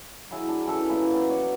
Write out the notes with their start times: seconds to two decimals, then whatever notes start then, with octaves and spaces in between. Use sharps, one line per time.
0.31 F#3 E4 G#4
0.48 D4
0.66 E3 C#4 A4 A#4
0.89 A#2 E3 B5
1.11 F#3 B3
1.30 C#5 D5